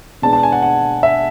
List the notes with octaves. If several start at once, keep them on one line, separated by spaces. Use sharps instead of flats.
B2 G#3 B3 D4 A5
A5
G#5
F#5
F#5
E5